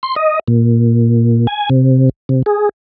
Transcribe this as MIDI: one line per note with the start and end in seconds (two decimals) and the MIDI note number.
0.03 0.15 84
0.16 0.39 75
0.48 1.47 46
1.47 1.69 80
1.70 2.09 48
2.29 2.43 48
2.46 2.69 68